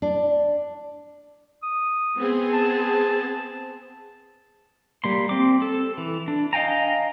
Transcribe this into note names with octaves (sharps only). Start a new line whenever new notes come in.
D4
D#6
B3 C4 G#4
A5
G3 A#3 C6
C4 D6
A4
E3
D4
D#5 F5 G5 G#5 A#5